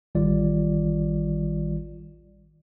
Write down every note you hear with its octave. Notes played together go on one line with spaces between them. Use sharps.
A1 D#3 G3 F4 D5